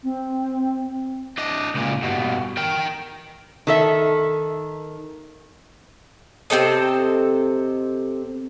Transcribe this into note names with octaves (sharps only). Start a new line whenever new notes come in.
C4
D4 D#5
C#2 A#2
G2 B2
A#4 G5
D#3 A4 E5
C3 C4 A4 D#5